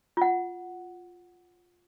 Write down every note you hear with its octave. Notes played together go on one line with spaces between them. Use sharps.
F4 F#5